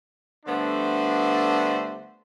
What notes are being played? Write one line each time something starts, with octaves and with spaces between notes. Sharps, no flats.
D3 G3 A3 B3 D4 C5